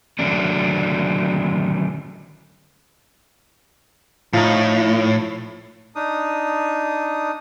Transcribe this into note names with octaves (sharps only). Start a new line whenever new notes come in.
D3 D#3 F#3 A3 C#4 D4
A2 F3 D#4
D4 D#4 D#6